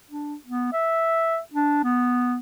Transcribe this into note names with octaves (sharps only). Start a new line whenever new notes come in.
D4
B3
E5
D4
B3